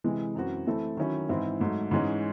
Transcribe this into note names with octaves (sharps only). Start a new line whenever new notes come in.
C3 E3 G#3
F#2 E3 C4 F#4
E3 A3 C4 E4 A4
D#3 F#3 C#4 E4
G#2 E3 C4 E4
G#2 F#3 A3
G#2 E3 G#3 C#4